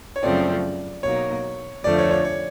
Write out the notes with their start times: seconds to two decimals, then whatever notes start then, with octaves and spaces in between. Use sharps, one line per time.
0.16 C#5
0.22 F#2 C#3 F3 A3 C4 D5
1.03 B2 F#3 A#3 D#4 C#5
1.84 F2 D3 F3 A3 D4 D5
1.98 C#5
2.11 C#5
2.25 C#5